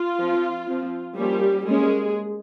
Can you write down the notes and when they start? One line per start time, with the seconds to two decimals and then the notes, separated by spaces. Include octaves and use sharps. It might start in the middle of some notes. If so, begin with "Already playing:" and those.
Already playing: F4
0.20 F3 C4
0.68 F3 C4
1.17 F3 G3 A#3 C#4 G4
1.65 G3 G#3 A#3 C#4 G#4